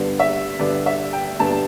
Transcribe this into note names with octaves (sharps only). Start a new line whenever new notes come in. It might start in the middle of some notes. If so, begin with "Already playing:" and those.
Already playing: G2 D3 G3 B3
E5
G2 D3 G3 B3 D5
E5
G5
G2 D3 G3 B3 A5